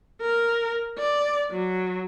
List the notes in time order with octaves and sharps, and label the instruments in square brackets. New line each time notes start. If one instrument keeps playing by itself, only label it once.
[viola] A#4
D5
F#3